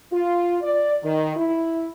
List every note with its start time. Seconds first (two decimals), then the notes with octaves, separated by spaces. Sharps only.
0.12 F4
0.62 D5
1.03 D#3
1.36 E4